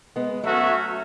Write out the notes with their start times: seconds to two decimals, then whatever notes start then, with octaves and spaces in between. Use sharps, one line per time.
0.16 G#3 B3
0.43 F#3 A3 C#4 F#4 A4 E5